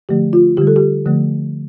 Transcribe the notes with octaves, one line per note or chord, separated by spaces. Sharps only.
D3 F3 A3 G4
F4
D3 G3 G4
A4
G4
D3 F3 A3